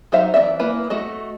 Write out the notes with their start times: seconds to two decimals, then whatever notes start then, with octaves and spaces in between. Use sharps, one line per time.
0.12 F#3 D#4 C5 E5 F5
0.34 E3 C#4 D5 E5
0.60 A#3 E4 B4 G#5
0.90 A3 F#4 D#5